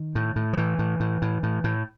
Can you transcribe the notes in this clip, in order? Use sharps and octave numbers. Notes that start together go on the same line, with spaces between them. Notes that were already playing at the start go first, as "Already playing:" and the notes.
Already playing: D#3
A2
A2
F3
A2 E3
A2
A2
A2
A2
A2